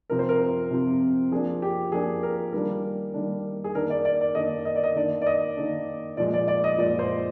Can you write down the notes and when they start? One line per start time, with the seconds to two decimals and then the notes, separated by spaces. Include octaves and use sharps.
0.10 C3 F3 C4 A#4
0.19 C5
0.29 A#4
0.70 C3 F3 C4
1.32 F3 A#3 D4 G#4
1.62 G4
1.92 F3 A#3 D4 G#4
2.23 A#4
2.53 D#3 G3 A#3 D4 A#4
3.14 D#3 G3 A#3 D4
3.64 G#4
3.75 D#3 A#3 D4 A#4
3.90 D5
4.05 D5
4.21 D5
4.35 D#3 A#3 D4 D#5
4.65 D#5
4.75 D5
4.84 D#5
4.96 D#3 A#3 D4 D5
5.22 D5
5.26 D#5
5.57 D#3 A#3 D4
6.17 A#2 F3 G#3 D5
6.33 D5
6.48 D5
6.64 D#5
6.78 A#2 F3 G#3 D5
6.99 C5